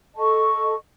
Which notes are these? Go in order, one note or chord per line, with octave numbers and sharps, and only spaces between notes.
A4 D#5 A5 C#6